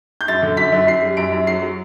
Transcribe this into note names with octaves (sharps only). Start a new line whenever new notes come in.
G6
F#2 A6
D3
F#2 B6
F#2
F#2 C7
G3
F#2 D7
F#2
F#3 C7
F#3